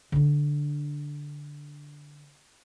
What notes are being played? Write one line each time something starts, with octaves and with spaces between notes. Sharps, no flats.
D3 D4